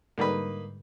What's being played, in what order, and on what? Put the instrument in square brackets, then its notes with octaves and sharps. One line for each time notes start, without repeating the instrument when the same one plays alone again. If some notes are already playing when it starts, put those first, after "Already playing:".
[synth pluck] G#2 D3 G3 [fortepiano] A#3 D#4 B4